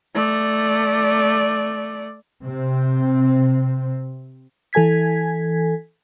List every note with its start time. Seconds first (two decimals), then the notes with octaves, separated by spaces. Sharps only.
0.15 A3 D5
2.44 C3 C4
4.73 E3 A4 G#5 G#6 B6